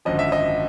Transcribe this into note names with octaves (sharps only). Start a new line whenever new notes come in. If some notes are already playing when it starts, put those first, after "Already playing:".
G#1 F#2 D3 F3 D#5
E5
D#5